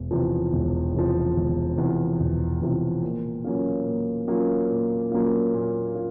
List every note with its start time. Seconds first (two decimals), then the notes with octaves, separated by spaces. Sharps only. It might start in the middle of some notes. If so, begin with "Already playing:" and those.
Already playing: E1
0.11 E2 C3 F3
0.53 E1
0.94 E2 C3 F3
1.36 E1
1.78 E2 C3 F3
2.20 E1
2.61 E2 C3 F3
3.03 A#2
3.44 F#3 A#3 C#4 F4
3.86 A#2
4.28 F#3 A#3 C#4 F4
4.70 A#2
5.11 F#3 A#3 C#4 F4
5.54 A#2
5.95 F4